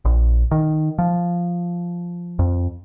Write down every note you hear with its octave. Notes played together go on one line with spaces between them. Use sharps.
A#1
D#3
F3
F2